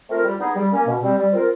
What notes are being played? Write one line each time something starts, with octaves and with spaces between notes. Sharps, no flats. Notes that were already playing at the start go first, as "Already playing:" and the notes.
A3 C4 F4 A#4
G3
B3 D#4 G#4
G3
A#3 C#4
B2
G3 C4
G3
C4 F4 A#4